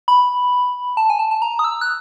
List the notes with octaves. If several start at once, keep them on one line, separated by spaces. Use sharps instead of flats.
B5
A5
G#5
A5
A5
A#5
D#6
E6
F#6